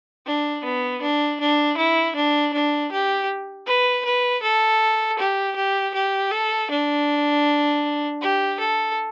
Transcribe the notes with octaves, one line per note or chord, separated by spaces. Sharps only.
D4
B3
D4
D4
E4
D4
D4
G4
B4
B4
A4
G4
G4
G4
A4
D4
G4
A4